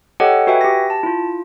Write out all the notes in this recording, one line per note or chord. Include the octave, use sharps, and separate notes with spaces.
G4 A4 C#5 D#5 F#5 G5
F#4 B4 E5 G5 G#5
G4 A#6
A5
E4 F4